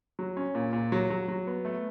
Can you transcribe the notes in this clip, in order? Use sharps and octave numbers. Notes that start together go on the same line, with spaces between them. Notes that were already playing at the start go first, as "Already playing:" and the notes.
F#3
C#4
A#2
A#2
F#3
F#3
F#3
B3
A3